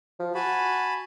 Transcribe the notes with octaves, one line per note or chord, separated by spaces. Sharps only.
F3
F#4 G#5 A5 B5